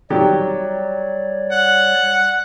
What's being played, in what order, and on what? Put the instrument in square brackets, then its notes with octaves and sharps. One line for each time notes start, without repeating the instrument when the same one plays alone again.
[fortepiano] D#3 F#3 G4 [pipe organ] G3 C#5 D5
[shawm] F#5